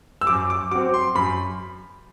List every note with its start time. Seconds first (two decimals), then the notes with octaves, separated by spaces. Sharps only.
0.21 E6
0.27 F#2 D6
0.50 D6
0.71 F#3 C4 D6
0.94 C6
1.15 F#2 B5